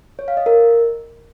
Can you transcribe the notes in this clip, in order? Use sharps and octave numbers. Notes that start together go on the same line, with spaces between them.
C#5
F5
D#5
A#4